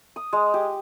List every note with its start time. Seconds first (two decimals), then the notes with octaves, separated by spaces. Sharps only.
0.16 D#6
0.33 G#3
0.54 G4